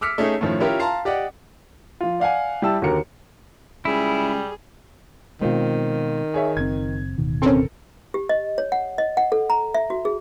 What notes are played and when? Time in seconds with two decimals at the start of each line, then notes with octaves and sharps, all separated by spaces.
0.01 D6 E6 F6 B6 C#7
0.18 A3 C#4 D#4 G#4
0.41 A2 D#3 F3 C#4
0.61 C#4 E4 F4 G4 A#4
0.80 F5 A5 A#5 C6
1.05 G4 D5 D#5 F#5
2.01 F3 F4
2.20 D5 F5 F#5 G#5
2.62 G3 E4 G4 A5 E6
2.82 D#2 D3 F#4 G4 A#4 C#7
3.85 C#2 G3 E4 G#4
5.41 B2 D#3 G#3 C4 F4
6.34 G#4 C#5 E5
6.57 F#1 C4 G#6
7.18 D1 B2 D#3
7.42 C4 C#4 A4 A#4
8.14 G4
8.29 D#5
8.58 C#5
8.72 F#5
8.98 D#5
9.17 F#5
9.32 A4
9.50 A#5
9.75 E5
9.90 F#4
10.05 G#4